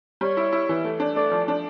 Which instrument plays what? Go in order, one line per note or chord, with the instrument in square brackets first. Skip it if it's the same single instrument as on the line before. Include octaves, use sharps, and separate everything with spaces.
[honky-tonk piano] G3 [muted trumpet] C#5
[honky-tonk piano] E4
E4
E3
A3
D4
[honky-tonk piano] A3 [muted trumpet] D5
[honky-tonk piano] F3
D4